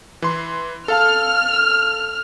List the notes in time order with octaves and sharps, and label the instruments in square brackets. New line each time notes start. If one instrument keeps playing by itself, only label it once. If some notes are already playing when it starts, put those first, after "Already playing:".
[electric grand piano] E3 C6
[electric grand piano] A4 F5 A5 [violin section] F6